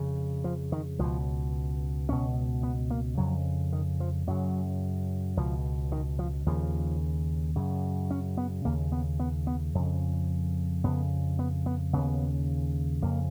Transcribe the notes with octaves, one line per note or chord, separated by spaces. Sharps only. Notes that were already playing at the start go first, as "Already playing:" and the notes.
Already playing: F2 C#3
F3
D#3
C#2 B2 F3
C#2 B2 C#4
B3
A#3
F2 C#3 F#3
D#3
F3
F#2 C#3 F#3
C#2 B2 F3
D#3
F3
D#2 C#3 F3
F#2 C#3
C#4
B3
D#2 C#3 A#3
B3
B3
B3
F2 C#3
F2 C#3 B3
B3
B3
D#2 C#3 B3
F2 C#3 A#3